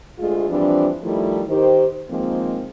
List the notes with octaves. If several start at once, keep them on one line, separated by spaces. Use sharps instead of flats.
D2 G#3 A3 F4 G#4
E3 F3 G3 C4 D4
D#3 F3 G3 A3 E4
D#3 G4 C5
D#3 F3 G#3 A#3 C4